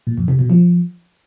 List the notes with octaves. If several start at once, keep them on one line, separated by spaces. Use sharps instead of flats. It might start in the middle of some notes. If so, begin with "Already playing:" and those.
A#2
F2
C3
B2
F3